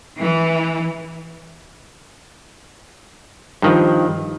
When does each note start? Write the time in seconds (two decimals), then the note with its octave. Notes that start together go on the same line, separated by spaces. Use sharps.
0.22 E3
3.62 G2 D#3 F3